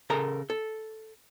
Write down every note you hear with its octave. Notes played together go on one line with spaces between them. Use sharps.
C#3 A4 A#4 A#5
A4